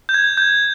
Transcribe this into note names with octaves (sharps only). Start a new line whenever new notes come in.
G6
G#6
G6